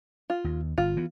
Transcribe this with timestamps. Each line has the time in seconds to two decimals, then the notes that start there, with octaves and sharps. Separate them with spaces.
0.30 F4
0.44 D#2
0.78 G1 F4
0.97 E3 B3